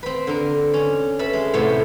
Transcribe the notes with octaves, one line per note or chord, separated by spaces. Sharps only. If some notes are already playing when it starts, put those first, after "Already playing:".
C4 B4
D3 A#4
C#4
A4 B4 E5 B5
G#3
A2 C3 B3 A4 C#5